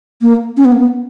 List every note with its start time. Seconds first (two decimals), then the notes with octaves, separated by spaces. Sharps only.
0.22 A#3
0.57 C#4
0.65 B3
0.72 A#3
0.80 B3